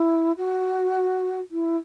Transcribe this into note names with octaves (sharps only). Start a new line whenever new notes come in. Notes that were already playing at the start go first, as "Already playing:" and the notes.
Already playing: E4
F#4
E4